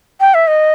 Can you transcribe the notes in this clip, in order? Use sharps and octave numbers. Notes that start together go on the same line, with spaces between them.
G5
E5
D#5